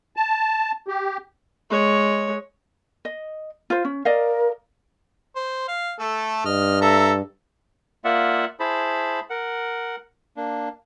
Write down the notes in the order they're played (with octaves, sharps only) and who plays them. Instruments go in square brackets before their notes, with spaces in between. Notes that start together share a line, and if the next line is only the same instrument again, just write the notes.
[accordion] A5
G4
[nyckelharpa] G#3 C#5
[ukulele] D#5
F4 C5
C#4
[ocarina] A#4 [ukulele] D5 D#5 F5
[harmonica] C5
F5
A3 A4
[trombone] G2 [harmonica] D#5 F6
[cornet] A4 [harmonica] E5 A#5
[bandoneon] A#3 F4 D5 E5 F#5
E4 G#4 C5 A5 B5
A#4 F#5
A#3 D4